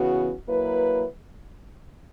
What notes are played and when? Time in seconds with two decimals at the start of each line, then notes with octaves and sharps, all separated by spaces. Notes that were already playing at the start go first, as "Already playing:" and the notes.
Already playing: C#3 E3 B3 F#4
0.48 F#3 A#3 E4 B4